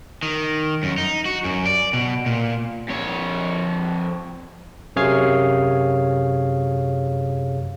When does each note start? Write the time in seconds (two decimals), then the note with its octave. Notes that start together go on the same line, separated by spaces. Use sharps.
0.23 D#3
0.83 F#2
0.98 D#4
1.26 F#4
1.44 F#2
1.66 D5
1.93 B2
2.26 A#2
2.88 F2 C#5
4.96 F#2 C3 G#4 C#5 F5 C7